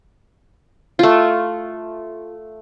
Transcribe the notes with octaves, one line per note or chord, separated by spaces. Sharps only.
A3 F4